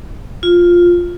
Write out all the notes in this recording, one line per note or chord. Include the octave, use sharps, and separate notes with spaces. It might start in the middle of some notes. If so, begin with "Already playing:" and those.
F4